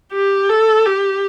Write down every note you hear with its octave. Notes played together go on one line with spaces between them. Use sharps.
G4
A4
G4